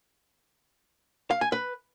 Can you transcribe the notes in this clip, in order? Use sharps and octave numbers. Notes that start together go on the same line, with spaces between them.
F5
G#5
B4